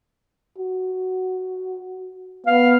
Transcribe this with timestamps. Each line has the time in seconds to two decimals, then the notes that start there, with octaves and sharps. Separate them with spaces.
0.58 F#4
2.47 B3 F5